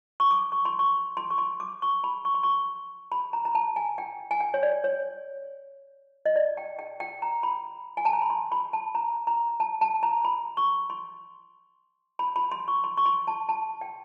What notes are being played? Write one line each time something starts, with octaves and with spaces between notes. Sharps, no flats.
C#6
D6
C#6
C6
C#6
C6
C#6
C6
D6
C#6
B5
C#6
C6
C#6
B5
A#5
A#5
A5
G#5
G5
G#5
G5
C#5
D5
C#5
D#5
D5
G5
G5
G5
A#5
B5
G#5
A5
A#5
B5
C6
B5
A5
A#5
A#5
A5
A5
A#5
B5
C#6
C6
B5
B5
C6
C#6
C6
C#6
C6
A5
A5
G5